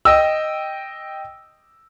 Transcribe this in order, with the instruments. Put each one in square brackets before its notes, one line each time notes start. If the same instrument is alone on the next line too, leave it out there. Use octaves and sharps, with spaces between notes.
[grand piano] D#5 G5 E6